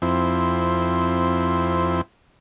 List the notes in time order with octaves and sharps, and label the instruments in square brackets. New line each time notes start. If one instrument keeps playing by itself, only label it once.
[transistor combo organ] F2 C4 E4